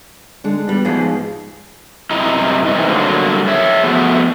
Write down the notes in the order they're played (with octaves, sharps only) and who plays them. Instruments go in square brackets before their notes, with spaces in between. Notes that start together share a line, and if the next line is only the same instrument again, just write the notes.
[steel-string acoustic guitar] D3 G#3 D4
[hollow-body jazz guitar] G3 [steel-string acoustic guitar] B3
[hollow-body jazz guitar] G#2 F3 G#4
[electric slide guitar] F#2 C3 E4 D#5 A#5
G#2 C3 E3 D#4
D3 F#3 G3 A#3
G#4 C#5 E5
F3 A3 B3 F#4